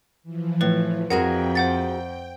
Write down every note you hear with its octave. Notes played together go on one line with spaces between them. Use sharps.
E3 F3
A2 B4
F2 F#4 G#4 A#4 F#5 G5
C5 F#5 A6